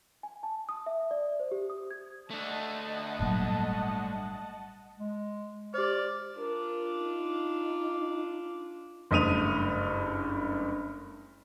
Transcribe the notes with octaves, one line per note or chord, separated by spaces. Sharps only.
G#5
A5
D#6
E5
D5
C5
G4
D#6
G#6
A3 D4 D#5 F#5 A5
G#1 A#2 F#3 G3
G#3
G4 C5 D5 F6
D4 F4 A#4
D#4
F#1 G2 A3 D#6 D#7 F7